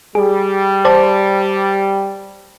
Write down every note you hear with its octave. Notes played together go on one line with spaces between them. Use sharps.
G3 G#4
C5 D5 A5